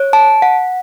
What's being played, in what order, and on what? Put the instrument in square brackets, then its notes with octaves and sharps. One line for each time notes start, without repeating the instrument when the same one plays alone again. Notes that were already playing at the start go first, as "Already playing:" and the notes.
Already playing: [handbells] C#5
A5
F#5